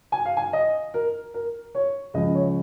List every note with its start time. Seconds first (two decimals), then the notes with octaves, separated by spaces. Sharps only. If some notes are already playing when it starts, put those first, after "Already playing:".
0.12 G#5
0.25 F5
0.37 G#5
0.53 D#5
0.94 A#4
1.34 A#4
1.75 C#5
2.14 C#2 C#3 F3 D#5
2.35 C#5